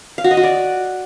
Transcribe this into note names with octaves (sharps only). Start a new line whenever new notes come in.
F5
F#4
D#5
F#4
D5